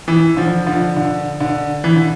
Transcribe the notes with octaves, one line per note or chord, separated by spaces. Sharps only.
E3
D3 F3
D3 F3
D3
D3
E3
D3